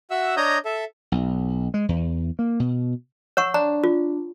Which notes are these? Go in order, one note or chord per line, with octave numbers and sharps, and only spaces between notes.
F#4 E5 F#5 E6
D4 C#5 D#5 A#5 D#6 G6
A4 E5
B1
G#3
E2
A#3
B2
C#5 F#5 C#6 E6
D4 A#5
F4